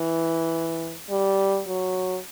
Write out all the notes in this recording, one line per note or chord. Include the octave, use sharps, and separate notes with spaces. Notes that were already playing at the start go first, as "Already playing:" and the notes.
Already playing: E3
G3
F#3